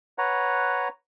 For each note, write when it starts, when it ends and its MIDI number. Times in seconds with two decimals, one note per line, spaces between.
0.18 0.88 71
0.18 0.88 73
0.18 0.88 78
0.18 0.88 82